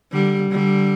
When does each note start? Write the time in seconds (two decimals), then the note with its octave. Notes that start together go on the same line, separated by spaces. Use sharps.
0.12 D3 G3
0.51 D3 G3